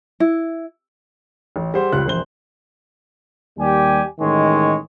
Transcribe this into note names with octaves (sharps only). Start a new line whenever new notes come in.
E4
A1
G3 G#4 C5 F#5
C#2 G3 F4 F#6
E1 A#1 C5 G7
D#2 G3 G4 G#5
A1 D#3 G#3 C#5